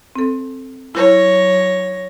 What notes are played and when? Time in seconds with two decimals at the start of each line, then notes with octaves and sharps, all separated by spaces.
0.16 C4 A4
0.95 F#3 E4 C#5 A#6